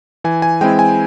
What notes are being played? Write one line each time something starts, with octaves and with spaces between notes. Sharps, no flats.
E3 G#5
G#5
G#3 C4 E4 G5
G#5